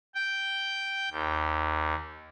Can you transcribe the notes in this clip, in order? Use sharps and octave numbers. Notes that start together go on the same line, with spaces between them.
G5
D#2